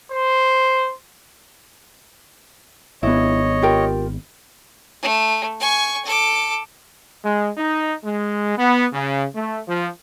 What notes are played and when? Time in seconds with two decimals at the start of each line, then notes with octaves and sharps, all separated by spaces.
0.11 C5
3.03 G#1 B3 E4 C#5 D#5
3.62 F4 G4 A#4
5.02 A3
5.60 G#5 C#6
6.05 A4 D6
7.23 G#3
7.56 D#4
8.03 G#3
8.57 B3
8.92 C#3
9.34 A3
9.67 F3